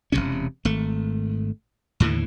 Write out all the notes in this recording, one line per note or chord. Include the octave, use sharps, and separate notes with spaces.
E1 B1 C3 C#4
G#1 A3
D#2 A2 D3 E3